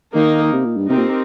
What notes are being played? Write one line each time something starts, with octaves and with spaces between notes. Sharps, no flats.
D#3 A#3 D#4 A#4
C3
A#2
G2
C3 C4 D#4 G4 A#4
A#2